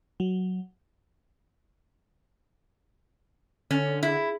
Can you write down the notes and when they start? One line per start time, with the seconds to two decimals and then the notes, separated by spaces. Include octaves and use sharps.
0.20 F#3
3.71 D3 C#4 A4 C#5
4.03 E4 G#4